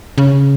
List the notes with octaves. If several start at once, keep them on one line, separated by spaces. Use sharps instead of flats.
C#3